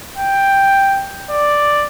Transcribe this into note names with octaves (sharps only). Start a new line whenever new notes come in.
G5
D5